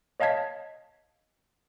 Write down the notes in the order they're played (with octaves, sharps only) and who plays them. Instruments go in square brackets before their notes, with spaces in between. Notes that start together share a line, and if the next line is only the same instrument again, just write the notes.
[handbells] C#5 D#5 F5 A5 G#6 B6